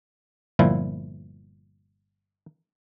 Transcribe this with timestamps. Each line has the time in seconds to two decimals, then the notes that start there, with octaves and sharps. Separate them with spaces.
0.59 G1 A#2 F3 E4